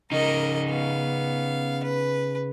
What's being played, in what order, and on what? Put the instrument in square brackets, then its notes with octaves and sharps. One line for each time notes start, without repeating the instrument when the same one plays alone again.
[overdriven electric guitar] C#3 D#4 [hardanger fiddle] A#4 D#5
[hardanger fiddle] B3 F5
B4